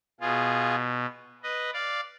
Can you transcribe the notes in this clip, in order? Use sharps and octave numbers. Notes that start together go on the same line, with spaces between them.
B2 F4 G#4
B4 D#5
D5 F5